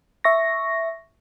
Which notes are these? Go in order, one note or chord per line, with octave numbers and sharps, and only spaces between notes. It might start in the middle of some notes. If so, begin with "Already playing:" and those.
E5 C#6 A#6